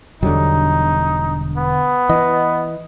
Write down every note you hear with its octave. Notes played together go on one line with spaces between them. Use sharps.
E1 E2 D3 F#3 G3 D#4
B3
E3 D#5